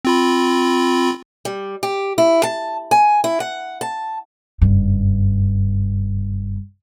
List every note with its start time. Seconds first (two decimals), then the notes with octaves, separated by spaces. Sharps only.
0.05 C4 F4 B5
1.45 G3
1.83 G4
2.18 E4
2.43 A5
2.91 G#5
3.24 E4
3.40 F#5
3.81 A5
4.62 F#1 G2